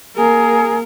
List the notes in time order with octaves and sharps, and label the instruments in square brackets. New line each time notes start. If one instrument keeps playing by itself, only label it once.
[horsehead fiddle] A#3 A#4 [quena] G#4